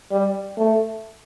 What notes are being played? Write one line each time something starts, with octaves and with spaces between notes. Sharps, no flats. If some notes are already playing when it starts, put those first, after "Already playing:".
G3
A3